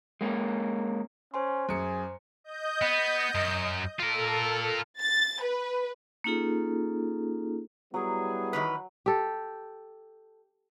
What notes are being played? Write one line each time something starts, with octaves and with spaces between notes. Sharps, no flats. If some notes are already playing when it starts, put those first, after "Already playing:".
G#3 A#3 C#4
C#4 C5 G#5 C6
F#2 G#4 C#7
D#5 G6
B3
F#2
F4 A4 A#4
A6
B4
A#3 C#4 D#4 F4 G#4 A4
F#3 G3 B3 E4 G#4
D#3 E3 B4
G4 A4